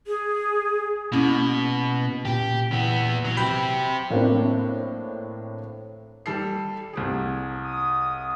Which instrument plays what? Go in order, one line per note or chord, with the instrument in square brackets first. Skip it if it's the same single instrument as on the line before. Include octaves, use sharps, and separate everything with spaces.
[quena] G#4
[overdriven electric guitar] B2 [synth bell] A#3 C#4 E4
[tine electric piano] A#2 [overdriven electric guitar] G4
[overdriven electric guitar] E3 B3
F#3
[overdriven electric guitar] C4 G4 [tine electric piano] B5 [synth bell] E6 G6
[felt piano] A2 A#3 C4 D4
G3 A4 C7
C2 G4 G#4
[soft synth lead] D#6